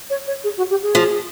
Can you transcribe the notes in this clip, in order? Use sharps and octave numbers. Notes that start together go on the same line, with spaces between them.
C#5
C#5
G#4
F#4
G4
G#4
F3